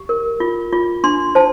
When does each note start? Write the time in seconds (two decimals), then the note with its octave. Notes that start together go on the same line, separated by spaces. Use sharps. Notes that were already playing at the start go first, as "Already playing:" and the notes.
Already playing: G4
0.09 A#4
0.40 F4
0.72 F4
1.04 D4 C6
1.35 C5 A5